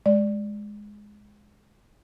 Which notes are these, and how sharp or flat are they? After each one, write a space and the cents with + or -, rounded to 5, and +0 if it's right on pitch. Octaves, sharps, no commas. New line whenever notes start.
G#3 +0 D5 +0